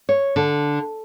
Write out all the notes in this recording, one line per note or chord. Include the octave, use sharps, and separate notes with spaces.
C#5
D3